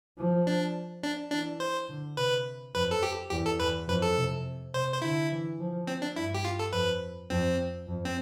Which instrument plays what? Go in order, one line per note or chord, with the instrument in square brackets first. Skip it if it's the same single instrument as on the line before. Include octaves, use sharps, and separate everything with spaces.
[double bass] F3
[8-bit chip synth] D4
D4
[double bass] E3 [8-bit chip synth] D4
[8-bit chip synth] C5
[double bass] D3
[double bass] C3 [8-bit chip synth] B4
[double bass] F2 [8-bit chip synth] B4
[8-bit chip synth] A4
G4
[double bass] E2 [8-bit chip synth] G4
[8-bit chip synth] A4
[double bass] E2 [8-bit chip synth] B4
[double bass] F2 [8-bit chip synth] B4
[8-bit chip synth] A4
[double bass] C3
[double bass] C3 [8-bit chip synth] C5
[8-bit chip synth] C5
[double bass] D3 [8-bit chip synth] E4
[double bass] E3
F3
[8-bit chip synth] C4
D4
[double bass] G2 [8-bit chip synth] E4
[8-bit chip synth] G4
F4
A4
[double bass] F2 [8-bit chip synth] B4
[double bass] F2 [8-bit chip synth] C4
[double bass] F2
[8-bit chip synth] C4